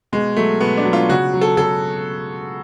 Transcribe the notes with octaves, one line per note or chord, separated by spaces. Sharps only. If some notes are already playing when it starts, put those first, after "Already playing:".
B2 G#3
F#3 A3
B2 B3
D4
F#3
F4
C#3 F#4
F#3
A4
C#3 A4